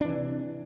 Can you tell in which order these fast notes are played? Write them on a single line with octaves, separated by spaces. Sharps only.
D4 E3 C3